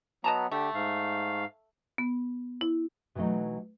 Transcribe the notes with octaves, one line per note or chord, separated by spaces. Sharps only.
F#3 B3 D#5 A5 A#5
D3 A3 G4
G#2 F5
B3
E4
B2 E3 F#3 A3 D#4